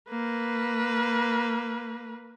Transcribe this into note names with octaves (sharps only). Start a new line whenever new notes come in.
A#3 B4